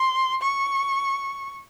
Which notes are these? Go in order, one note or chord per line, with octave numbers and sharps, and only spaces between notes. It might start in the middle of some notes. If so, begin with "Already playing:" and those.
Already playing: C6
C#6